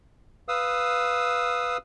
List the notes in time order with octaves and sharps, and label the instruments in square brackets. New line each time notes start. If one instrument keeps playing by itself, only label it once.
[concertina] B4 F5 D#6 E6